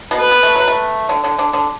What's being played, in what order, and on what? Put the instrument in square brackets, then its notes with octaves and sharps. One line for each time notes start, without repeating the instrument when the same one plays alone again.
[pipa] B2 B3
[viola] B4
[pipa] B3
A3
F#3
A3
D3 D4
D3 D4
D3 D4
D3 D4